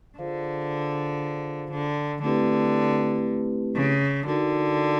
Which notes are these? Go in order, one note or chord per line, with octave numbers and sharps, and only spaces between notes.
D3 F4 G#4 C5 F5
D3
D3 A3 C4 E4 G4 B4
C#3
D3 D#4 F#4 A#4